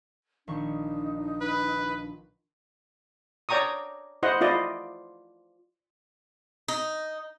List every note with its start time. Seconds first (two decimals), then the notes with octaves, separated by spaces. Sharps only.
0.48 A#1 D#3 D4 D#4 C#6
1.41 B4
3.49 C#5 D5 G5 A#5 C#6 D#6
4.23 E4 C5 D#5 F#5
4.41 E4 F4 D5 D#5
6.68 D#4